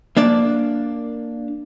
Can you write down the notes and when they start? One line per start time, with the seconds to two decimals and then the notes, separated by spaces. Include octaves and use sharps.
0.17 A#3 D4 D5